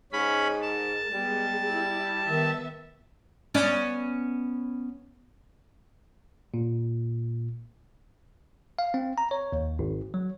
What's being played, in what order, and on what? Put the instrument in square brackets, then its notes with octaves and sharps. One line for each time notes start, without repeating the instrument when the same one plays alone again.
[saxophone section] G#2 [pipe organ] C#4 B5
[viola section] A#4 [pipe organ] A5
[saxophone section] G3 [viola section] G#3 B3 G#4
[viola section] E4
[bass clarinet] D#3 [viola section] B3 E5
[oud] B3 C#4 D5
[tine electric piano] A#2
F5
C4
A#5
C#5
D#2
G#1
F#3